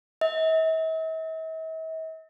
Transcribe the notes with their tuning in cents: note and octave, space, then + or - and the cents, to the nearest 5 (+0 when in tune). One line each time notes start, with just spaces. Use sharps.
E5 -45